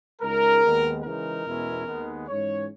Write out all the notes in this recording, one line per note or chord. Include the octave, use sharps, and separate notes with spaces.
C#2 C#3 G#3 D#4 A#4
D#2 D#3 G#3 B3
C#3 E3 G#3 D#4 A#4
E2 B2 G#3 C#4 E4
D#2 D#3 G#3 B3
G#2 E3 G#3 C#4 C#5